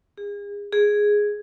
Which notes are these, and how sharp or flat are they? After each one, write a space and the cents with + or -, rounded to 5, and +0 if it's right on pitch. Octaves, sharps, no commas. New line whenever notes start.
G#4 -35
G#4 +0